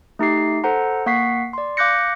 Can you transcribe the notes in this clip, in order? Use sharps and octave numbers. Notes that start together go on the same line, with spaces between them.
A3 D#4 G4 C7
A4 C5 F#5 A#5
A#3 F#5 C#6 B6 C7
D5 C6
F5 D6 F#6 G6 A#6 C#7